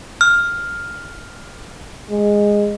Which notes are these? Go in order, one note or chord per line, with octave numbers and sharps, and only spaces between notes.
F6
G#3